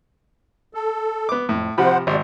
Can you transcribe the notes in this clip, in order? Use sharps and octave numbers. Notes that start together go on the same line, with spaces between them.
A4
B3 D6
F2 A2
C3 F3 C5 F#5 B5
G#1 C3 D5